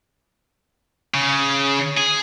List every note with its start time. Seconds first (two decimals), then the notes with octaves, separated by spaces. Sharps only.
1.14 C#3
1.98 G#4